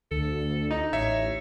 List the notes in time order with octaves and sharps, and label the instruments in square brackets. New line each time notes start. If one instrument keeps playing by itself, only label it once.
[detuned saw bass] D2 [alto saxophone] A4
[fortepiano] D#4
[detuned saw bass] A1 [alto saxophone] C#5 [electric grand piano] E5